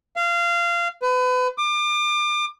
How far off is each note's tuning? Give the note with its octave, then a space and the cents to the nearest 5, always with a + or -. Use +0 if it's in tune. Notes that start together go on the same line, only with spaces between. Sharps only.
F5 -20
B4 +35
D6 +35